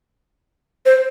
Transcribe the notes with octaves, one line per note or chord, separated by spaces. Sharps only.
C5